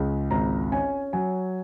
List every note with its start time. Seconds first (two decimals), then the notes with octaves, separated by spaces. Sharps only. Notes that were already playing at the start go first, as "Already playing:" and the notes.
Already playing: C#2 C#3
0.31 G#1 A#5
0.72 C#4 G#5
1.13 F#3 G#5